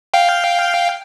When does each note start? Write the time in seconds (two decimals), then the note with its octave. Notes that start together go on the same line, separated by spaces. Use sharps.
0.14 F5 G5